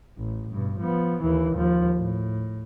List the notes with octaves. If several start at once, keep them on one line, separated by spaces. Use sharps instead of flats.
A1
G2 B2
F3 B3
D#2 E3
D#2 F3
A2